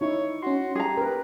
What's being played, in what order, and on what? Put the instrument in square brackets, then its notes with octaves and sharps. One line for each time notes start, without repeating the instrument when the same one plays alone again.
[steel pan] D#4 E4 [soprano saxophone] C#5
[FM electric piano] C#4 C6 [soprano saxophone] F#4
[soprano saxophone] G4 [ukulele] G#4 A#5
[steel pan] A#4 B4